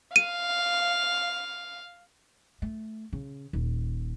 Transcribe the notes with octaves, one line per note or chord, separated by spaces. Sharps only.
F5 D#7
A3
C#3
D#1